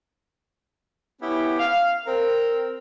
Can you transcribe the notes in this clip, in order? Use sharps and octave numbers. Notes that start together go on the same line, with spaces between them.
B3 C#4 E4 G4
F5
C4 A#4